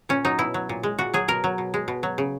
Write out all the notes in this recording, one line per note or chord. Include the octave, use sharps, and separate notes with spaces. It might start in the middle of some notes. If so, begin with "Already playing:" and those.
A#2 C#4
F#3 D#4
B2 E4
F#3
A#2
G#3
A#2 F#4
F#3 G#4
B2 A#4
F#3
B2
G#3
B2
F#3
C#3